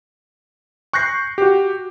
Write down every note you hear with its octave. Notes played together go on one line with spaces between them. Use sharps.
C#6 F#6 G6 A#6 C7
F#4 G4